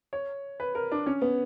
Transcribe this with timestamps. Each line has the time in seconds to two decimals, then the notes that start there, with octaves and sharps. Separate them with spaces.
0.13 C#5
0.60 B4
0.75 A#4
0.92 D4
1.06 C#4
1.22 B3